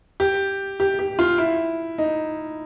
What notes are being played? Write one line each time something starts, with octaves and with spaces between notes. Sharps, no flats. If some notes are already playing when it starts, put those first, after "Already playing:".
G4
G4
G4
F4
E4
D#4